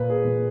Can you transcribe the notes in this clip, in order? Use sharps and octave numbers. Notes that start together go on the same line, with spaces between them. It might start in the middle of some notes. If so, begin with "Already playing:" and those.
Already playing: A#2 B4
G#4
A#2